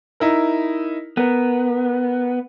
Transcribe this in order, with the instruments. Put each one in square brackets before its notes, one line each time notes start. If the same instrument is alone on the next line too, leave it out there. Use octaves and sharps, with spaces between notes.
[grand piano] D#4 E4 A#4
[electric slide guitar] B3 [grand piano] A#4